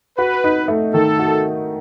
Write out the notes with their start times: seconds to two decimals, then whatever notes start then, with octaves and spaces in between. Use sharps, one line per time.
0.18 F#4 B4
0.44 D#4
0.68 A3
0.94 D#3 A4
1.19 F#4